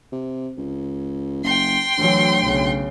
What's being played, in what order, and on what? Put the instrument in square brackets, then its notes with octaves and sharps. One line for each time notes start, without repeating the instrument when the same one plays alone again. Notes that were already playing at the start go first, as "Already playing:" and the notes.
[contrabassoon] C3
C#2
[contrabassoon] F#1 [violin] G5 C6
[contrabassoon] D2 [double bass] E3 F#3
[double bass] B1 C#3